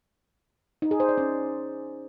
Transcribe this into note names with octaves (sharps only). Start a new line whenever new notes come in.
D#4
G#4
C5
D5
C#4